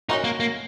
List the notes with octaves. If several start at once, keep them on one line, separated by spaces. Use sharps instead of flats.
C#4 D#4 F#4 A#4
A#3
A#3